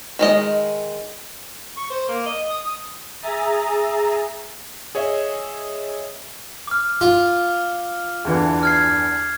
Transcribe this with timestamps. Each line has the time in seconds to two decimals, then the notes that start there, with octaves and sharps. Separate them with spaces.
0.19 D#3 G#3 D#5
1.77 C#6
1.90 C5
2.08 A#3
2.26 D#5
2.50 D#6
2.66 D#6
3.21 G#4 E5 A#5 D#6 A6
4.95 G#4 C#5 D#5 E5
6.67 D6 F6
7.01 F4
8.25 E2 D3 E3
8.63 F6 G#6 C7